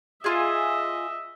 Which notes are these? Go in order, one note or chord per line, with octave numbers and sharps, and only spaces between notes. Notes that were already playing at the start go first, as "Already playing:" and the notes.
F4 G#4 D#5 E5